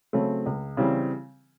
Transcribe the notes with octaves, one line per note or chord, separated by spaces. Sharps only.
C#3 F#3 A3 C4
C#2
C#3 E3 G3 C4